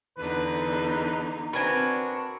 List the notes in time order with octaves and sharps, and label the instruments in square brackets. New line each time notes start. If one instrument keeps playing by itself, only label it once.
[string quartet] E2 D3 D#4 [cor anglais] B4
[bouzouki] C4 D4 A#4 [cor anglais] F#4 [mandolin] B4 G#5